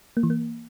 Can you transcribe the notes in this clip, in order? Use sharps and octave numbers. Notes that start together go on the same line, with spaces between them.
A#3
E3
A#3